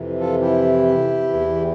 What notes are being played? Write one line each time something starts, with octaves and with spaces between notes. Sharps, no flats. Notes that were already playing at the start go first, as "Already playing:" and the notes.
Already playing: F2 C3 E3
F4 A4
E4 G4
E2 E3